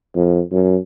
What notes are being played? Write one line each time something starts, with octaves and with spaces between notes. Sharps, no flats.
F2
F#2